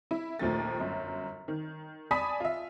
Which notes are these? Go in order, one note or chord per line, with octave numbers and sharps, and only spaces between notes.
E4
A#1 D#2 F3 A3 A6
G1 F#2
D#3
D5 G#5 A5 B5 D#6 B6
F4 E5